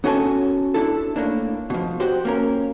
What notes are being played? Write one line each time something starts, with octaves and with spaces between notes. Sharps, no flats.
B3 C#4 F#4 A4 G#5 A5
D4 E4 A4
A2 A#3 D4
B2 F3
F#4 G4 C5
A#3 C#4 A#4